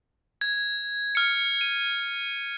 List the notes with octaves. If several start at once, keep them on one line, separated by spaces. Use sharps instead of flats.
G#6
F6 C#7
D#7